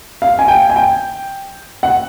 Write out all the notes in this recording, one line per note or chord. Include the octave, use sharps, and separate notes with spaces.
F5
G#5
G5
G#5
G5
F#5